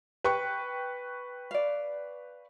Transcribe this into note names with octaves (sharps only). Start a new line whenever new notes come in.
B4 G5 C#6
D5 F5